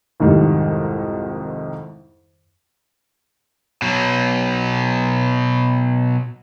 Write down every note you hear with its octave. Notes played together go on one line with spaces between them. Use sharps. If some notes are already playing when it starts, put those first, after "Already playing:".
C2 F2 G#2 D#3 G3
B2 F#3